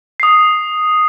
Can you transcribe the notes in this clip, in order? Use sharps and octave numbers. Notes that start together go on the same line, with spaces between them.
D#6 C7